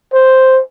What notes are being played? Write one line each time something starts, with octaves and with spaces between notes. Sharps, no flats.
C5